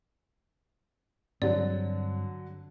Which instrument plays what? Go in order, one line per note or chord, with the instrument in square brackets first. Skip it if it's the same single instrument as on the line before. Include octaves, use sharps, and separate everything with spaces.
[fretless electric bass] G2 C4 [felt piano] D3 F#3 [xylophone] D5